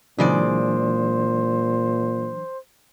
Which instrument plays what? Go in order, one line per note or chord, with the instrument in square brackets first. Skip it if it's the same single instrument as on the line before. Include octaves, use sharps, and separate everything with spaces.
[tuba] A#2 [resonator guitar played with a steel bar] C#3 G#3 D5 [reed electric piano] E3 F#3 D4 [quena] C5